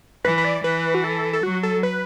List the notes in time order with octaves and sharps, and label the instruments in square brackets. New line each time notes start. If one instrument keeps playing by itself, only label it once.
[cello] E3 [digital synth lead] B4
[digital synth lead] B4
D5
[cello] E3 [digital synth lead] B4
[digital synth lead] F#4
A4
A4
[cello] F#3 [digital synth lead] F#4
[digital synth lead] A4
B4